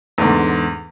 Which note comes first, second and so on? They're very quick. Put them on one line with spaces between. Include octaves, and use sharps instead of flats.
E2 G#2 D3